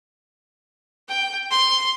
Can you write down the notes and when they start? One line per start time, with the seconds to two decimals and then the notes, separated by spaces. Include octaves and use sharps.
1.09 G5
1.51 C6